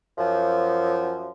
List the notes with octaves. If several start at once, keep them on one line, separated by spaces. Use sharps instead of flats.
F#2 F3